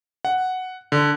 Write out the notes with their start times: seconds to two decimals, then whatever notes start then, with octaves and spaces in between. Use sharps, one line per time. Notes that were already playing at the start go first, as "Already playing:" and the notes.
0.25 F#5
0.92 D3